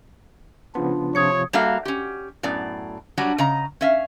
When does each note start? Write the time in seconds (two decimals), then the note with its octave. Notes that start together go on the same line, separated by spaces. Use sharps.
0.75 C#3 F3 B3 D4 F4
1.15 C3 F3 C#5 D#6 G#6 C#7
1.53 G3 A#3 F#4 A4 E5 F5
1.85 C#4 G4
2.43 F#2 A2 B3 D5
3.18 F#3 G3 D4 F#4
3.38 C#3 D#5 A#5
3.81 C#4 E5 F5